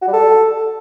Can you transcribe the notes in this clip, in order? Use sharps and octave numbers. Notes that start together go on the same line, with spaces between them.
F#4
G3
A4